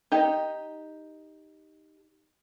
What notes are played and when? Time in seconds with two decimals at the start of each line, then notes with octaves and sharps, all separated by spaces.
0.12 D#4 G4 D#5